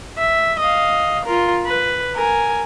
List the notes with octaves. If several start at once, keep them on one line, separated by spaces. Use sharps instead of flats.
E5
D#5 F5
F4 A#4
B4
A#4 G#5